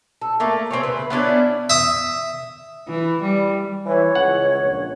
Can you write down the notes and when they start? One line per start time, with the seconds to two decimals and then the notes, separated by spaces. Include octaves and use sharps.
0.22 A4
0.40 A3 A#3
0.71 C4 G#4 C#5
0.83 C#3 B4
1.10 B3 C#4 D4 E4
1.70 E5 D#6
2.89 E3
3.23 G3
3.86 E3 C#5
4.15 C#2 F#5
4.63 A#1